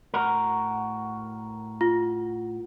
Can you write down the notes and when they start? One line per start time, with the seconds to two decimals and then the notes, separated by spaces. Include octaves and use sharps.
0.14 A2 F#4 A#4
1.81 F4